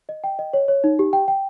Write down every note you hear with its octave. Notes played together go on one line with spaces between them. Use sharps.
D#5
G5
D#5
C#5
C#5
D#4
G4
G5
G5